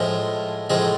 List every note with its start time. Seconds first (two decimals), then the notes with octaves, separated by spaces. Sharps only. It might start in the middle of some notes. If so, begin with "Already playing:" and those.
Already playing: A2 F3 G#3 G#4
0.70 A2 F3 G#3 G#4